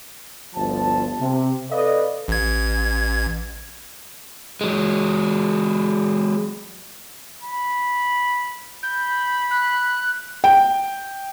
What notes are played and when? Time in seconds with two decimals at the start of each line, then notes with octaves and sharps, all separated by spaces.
0.54 G1 D2 F3 A5
1.20 C3
1.70 A4 B4 D5 D#5 F5
2.28 A1 G#6
4.61 F#3 G#3
7.43 B5
8.83 B5 G6
9.51 F#6
10.44 G5